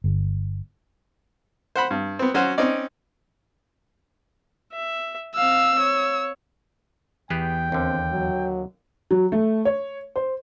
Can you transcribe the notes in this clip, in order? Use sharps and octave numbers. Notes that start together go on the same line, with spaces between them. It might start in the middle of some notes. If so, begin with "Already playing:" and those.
G1
C5 F#5 B5
G2
B3 C4
F#3 C#4 F#4 C5 F#5
C4 C#4 D#4 D5
E5
C4 F5 E6
C#5
E2 B3 G4 G#4 G5
D#2 D3 C4
F#3
F#3
A3
C#5
C5